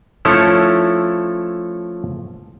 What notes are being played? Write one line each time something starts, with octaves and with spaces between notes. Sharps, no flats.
F3 A3 C#4 E4 A4 C#5